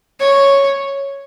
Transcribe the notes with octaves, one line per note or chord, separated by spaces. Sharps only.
C#5